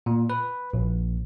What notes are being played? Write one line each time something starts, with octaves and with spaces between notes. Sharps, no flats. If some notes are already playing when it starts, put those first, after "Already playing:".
A#2
B4
A#1